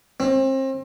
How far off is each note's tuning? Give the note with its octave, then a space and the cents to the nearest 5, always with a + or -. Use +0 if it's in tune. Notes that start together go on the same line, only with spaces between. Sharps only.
C4 +35